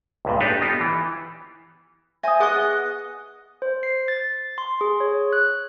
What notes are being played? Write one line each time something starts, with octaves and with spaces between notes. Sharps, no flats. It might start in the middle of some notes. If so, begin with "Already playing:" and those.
C#2 G2 A#2
D4 D#4 G4 A4 B4
B3 D#4 F4 G4 A4
E3
C5 E5 G#5 D#6
B3 G#4 D#5 F#5 C#6
C5
C7
A6
C6
G#4
C#5
F#6